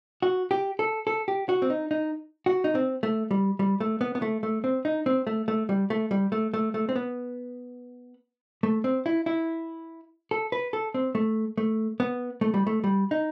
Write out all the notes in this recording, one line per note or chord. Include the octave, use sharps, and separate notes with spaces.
F#4
G4
A4
A4
G4
F#4
C4
D#4
D#4
F#4
D#4
C4
A3
G3
G3
A3
B3
B3
A3
A3
C4
D#4
C4
A3
A3
G3
A3
G3
A3
A3
A3
C4
B3
A3
C4
E4
E4
A4
B4
A4
C4
A3
A3
B3
A3
G3
A3
G3
D#4